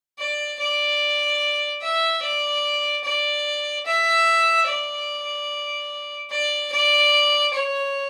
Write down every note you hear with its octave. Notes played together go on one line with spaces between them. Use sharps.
D5
D5
E5
D5
D5
E5
D5
D5
D5
C#5